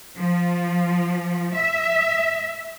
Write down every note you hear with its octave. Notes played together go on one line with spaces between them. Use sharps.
F3
E5